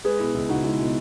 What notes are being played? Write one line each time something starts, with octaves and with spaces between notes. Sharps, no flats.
G#3 G#4 B4
B2 E4
C#2 E4
C#2 D#4 F#4
G#3 E4
B2